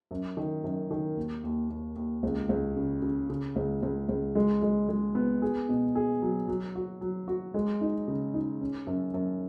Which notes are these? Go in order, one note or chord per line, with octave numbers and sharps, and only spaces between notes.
F#2
D#3
F#2
D#3
D#2
D#2
D#2
D#2
C#2
C#2
C#3
C#3
C#3
C#2
C#2
C#2
G#3
G#3
G#3
B3
G#4
B2
G#4
F#3
F#3
F#4
F#3
F#4
G#3
D#4
C#3
D#4
C#4
F#2
F#2